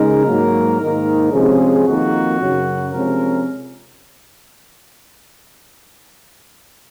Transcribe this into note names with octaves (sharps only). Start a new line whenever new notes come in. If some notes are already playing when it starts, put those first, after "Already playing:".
Already playing: C#3 G#3 D#4 A#4
G#2 F#3 A#3
G#2 D#3 A#3 D#4
C3 F3 G#3 C#4 G#4
F2 D#3 A#3 D#4 F#4
F#2 C#3 F#3
C3 F3 G#3 C#4 A#4